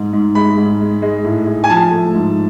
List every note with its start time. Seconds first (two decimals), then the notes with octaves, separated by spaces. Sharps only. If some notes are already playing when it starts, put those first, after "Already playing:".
Already playing: G#2
0.13 G#2
0.35 G#3 B5
0.58 G#2
0.81 G#3
1.02 G#3
1.25 A2
1.47 G#3
1.64 G#5
1.69 F3 A5
1.91 A3
2.14 G#2